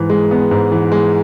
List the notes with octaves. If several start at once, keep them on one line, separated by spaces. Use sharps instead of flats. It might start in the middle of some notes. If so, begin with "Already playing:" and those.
Already playing: G#2 E3
G#3
B3
G#2
E3
G#3